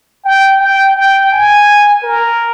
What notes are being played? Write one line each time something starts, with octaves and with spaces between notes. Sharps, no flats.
G5
G5
G5
G#5
A#4